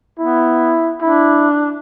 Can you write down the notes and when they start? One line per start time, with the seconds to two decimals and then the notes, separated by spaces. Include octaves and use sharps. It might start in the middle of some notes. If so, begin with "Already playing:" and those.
0.19 B3 E4
1.02 D4 E4